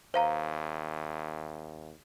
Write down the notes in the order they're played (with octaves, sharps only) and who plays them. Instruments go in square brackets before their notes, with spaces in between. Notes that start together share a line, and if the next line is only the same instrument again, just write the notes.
[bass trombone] D#2 [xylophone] C5 F5 A#5